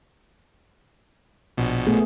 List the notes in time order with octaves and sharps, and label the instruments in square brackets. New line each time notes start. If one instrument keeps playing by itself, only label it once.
[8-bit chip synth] A#1 B2
[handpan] A3 B3 G#4